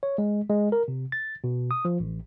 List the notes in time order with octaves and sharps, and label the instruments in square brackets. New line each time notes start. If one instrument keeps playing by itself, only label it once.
[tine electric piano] C#5
G#3
G#3
A#4
C3
A6
B2
D#6
F3
A1